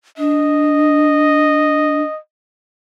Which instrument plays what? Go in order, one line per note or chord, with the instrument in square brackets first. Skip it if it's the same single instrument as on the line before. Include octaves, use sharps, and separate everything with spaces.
[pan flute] D4 [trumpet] D#5